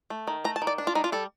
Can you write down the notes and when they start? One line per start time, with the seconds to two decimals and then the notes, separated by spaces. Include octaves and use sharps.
0.10 A3
0.28 D#3
0.44 A3 A#5
0.56 A5
0.62 D#3
0.67 D5
0.78 D4
0.87 F4
0.95 G3 D#4
1.04 F4
1.12 G3 A4